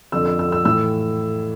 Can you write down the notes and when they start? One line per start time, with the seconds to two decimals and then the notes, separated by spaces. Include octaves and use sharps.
0.12 F2 D3 F3 E6
0.26 E6
0.39 E6
0.52 E6
0.65 A2 E3 E6